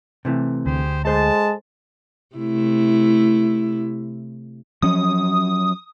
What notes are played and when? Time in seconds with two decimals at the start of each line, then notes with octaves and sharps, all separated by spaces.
0.25 C3 E3 A3
0.66 D2 G4 G#4 C5
1.05 G#3 A4 C5 A5
2.36 C3 A3 E4
4.82 F3 F#3 C#4 D#6